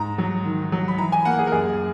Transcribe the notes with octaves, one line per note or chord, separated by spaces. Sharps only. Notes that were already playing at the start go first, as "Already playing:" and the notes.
Already playing: G#2 A#5
F#3
D#3
F#3
B5
E3 A#5
G#5
A#3 F#5
G#4
A#4
F#2 G#4